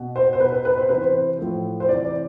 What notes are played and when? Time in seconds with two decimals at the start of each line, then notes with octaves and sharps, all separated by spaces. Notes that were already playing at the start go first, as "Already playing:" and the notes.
Already playing: B2
0.16 C5
0.33 C5
0.40 B2 B4
0.52 B4
0.65 B4
0.78 C5
0.89 C3 E3 B4
1.01 C5
1.38 A2 F3
1.80 C5
1.88 C3 E3 D5
2.05 D5